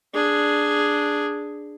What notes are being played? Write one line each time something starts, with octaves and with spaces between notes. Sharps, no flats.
D4 G#4